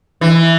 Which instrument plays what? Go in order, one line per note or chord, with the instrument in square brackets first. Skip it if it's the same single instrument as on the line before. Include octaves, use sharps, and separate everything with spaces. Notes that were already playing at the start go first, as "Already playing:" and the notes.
[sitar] E3